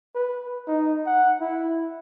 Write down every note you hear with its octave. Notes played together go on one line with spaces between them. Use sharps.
B4
D#4
F#5
E4